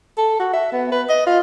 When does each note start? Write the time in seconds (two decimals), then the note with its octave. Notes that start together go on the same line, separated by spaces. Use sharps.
0.17 A4
0.40 F#4
0.53 E5
0.72 B3
0.92 B4
1.09 D#5
1.27 F4